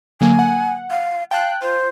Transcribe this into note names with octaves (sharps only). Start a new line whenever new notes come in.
D3 F#3 A#3 G#5
F#5
F5
F5 G5 A5 F#6
F4 C5